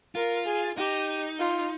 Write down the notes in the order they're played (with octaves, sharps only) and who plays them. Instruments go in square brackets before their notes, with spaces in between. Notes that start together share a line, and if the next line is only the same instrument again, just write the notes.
[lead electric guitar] F4 [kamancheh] A#4
[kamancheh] G#4
[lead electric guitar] D#4 [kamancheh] G4
[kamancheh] F4